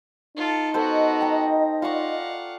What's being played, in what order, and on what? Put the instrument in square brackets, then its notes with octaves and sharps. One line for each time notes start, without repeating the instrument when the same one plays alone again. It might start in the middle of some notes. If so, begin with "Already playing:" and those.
[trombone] D#4 [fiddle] F4 A4
[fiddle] B3 F#4 [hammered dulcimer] A4 C5 [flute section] D#5
[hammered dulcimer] G5 A#5
[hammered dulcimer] F4 D5 C#6 [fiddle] F5 F#5